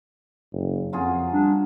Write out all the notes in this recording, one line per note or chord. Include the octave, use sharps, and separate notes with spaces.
F#1
F2 F#3 F4 G#4
G3 D4